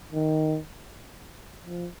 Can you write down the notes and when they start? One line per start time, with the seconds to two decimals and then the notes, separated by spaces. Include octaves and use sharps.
0.12 D#3
1.64 F3